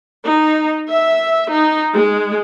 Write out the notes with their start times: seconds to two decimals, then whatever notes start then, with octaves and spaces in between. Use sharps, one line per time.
0.24 D#4
0.89 E5
1.52 D#4
1.94 G#3